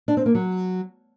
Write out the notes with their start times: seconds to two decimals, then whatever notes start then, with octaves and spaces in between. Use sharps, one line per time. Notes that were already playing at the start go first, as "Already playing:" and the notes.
0.08 D4
0.17 C4
0.26 A#3
0.35 F#3